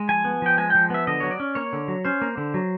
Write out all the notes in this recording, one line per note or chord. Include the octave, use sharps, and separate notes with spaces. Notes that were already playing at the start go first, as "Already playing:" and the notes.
Already playing: G#3
F3 G#5
B3
F3 G5
G#3 G#5
F3 G5
B3 E5
D3 D#5
F#3 C#5
D5
C#4
A#3 C#5
D3
F#3
C#4 C5
A#3
D3
F#3